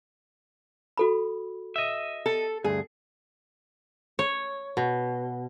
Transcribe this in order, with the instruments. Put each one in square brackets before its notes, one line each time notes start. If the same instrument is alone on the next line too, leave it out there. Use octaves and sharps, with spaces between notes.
[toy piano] F#4 A4 B5
[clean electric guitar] D#5 E5
[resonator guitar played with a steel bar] A4
[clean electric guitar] D2 G2 [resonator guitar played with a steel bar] G#4
[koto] C#5
B2